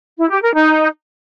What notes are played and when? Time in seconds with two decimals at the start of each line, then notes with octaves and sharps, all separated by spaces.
0.19 E4
0.30 G4
0.42 A#4
0.54 D#4